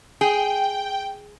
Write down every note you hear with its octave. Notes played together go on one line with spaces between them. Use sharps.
G#4 G5